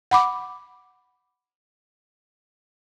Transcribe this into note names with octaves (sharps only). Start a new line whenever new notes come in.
F#5 B5 D6